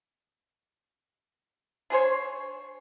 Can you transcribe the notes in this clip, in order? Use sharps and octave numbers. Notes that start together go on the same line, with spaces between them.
D4 G#4 C5 C#5